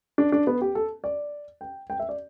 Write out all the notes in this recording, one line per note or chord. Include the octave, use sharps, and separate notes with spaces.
D4
D4
B3
G4
A4
D5
G5
G5
E5
D5